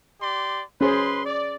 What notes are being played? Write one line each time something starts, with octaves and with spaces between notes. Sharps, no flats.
G4 D5 C6
C#4 G#4 B4 C5 C6
D5